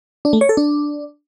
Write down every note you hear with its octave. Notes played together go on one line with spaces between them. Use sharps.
D4
A3
C#5
A4
D4